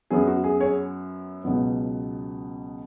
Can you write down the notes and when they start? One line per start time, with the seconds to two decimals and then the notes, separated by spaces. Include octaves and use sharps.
0.10 F#2 F#3 B3 G#4
0.27 F#4
0.44 G#4
0.60 G#4 C#5
1.44 C#2 B2 F#3 B3